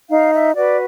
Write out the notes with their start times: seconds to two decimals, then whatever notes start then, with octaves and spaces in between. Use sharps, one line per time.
0.10 D#4 F5
0.33 E5
0.55 F#4 B4 D5